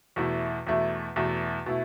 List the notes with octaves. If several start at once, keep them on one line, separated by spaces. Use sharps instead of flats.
E2 B2 A3 E4
E2 B2 A3 E4
E2 B2 A3 E4
B2 A3 E4